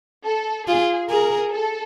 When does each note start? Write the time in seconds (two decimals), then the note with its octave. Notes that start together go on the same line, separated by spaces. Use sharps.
0.25 A4
0.68 F4 G#4
1.10 G#4 A#4
1.53 A4